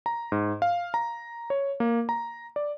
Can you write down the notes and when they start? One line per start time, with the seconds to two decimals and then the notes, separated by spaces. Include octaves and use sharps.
0.06 A#5
0.32 G#2
0.62 F5
0.94 A#5
1.50 C#5
1.80 A#3
2.09 A#5
2.56 D5